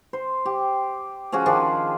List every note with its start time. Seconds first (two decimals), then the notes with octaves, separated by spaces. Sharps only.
0.13 C5
0.46 G4
1.32 F3 C#4 F#4 G#4
1.46 D#3 F3 D4 G#4